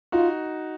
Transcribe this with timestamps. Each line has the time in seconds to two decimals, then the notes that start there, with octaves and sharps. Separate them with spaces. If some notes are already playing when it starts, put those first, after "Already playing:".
0.12 D#4 F4 F#4